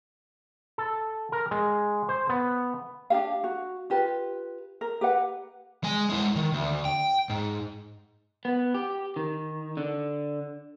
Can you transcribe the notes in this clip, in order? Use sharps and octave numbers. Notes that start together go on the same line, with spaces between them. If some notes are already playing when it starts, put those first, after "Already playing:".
A4
A#4
G#3
C5
B3
D4 F#4 G4 F5
F#4
F4 G4 B4
A#4
G4 B4 F#5
G#3 G#5
G#3 E4
D#3
D2
G5
G#2
B3
G4
D#3
D3